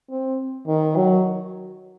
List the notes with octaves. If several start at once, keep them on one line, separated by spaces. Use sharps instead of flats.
C4
D#3
F#3